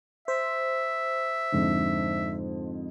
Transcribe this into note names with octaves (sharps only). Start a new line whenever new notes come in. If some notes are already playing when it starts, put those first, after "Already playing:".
C5 E5
F2 G#2 D3